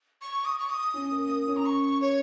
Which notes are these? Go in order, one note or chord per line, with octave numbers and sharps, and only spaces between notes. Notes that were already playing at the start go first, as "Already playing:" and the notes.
C#6
D#6
C#6
D#6
C#4
A#3
A#3
C#4
A#5
C#6
C#5